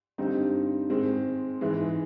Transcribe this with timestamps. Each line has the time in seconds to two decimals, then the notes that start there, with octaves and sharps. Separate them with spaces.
0.18 G2 D3 G3 C4 D#4
0.90 G#2 D#3 G#3 C4
1.61 G#2 E3 G#3